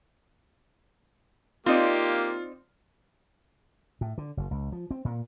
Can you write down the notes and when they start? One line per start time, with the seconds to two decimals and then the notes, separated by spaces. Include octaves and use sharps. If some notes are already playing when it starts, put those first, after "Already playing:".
1.66 A#3 C4 D#4 F4 G4 D5
4.01 A2
4.18 D3
4.37 F#1
4.51 C#2
4.72 F3
4.91 C4
5.05 A#2